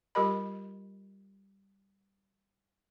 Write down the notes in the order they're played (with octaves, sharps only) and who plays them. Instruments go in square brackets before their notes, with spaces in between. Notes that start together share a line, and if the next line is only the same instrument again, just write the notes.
[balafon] G3 F4 G4 A#4 D#5 B5